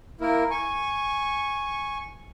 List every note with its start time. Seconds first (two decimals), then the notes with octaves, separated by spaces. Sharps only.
0.21 A#3 E4 A#4
0.51 G#5 C#6